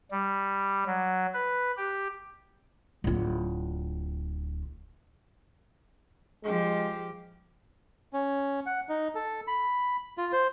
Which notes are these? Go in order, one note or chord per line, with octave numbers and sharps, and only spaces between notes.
G3
F#3
B4
G4
D1 F4
F3 G#3 G4
C#4
F#5
D#4
A4
B5
F4
C5